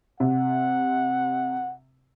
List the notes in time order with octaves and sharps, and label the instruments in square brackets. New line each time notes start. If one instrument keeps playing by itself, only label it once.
[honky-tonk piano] C3 [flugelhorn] F#5